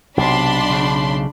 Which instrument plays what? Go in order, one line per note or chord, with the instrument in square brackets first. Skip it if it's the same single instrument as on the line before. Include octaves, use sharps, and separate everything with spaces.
[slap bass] B1 [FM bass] C3 [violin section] D4 B5 C6
[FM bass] C#3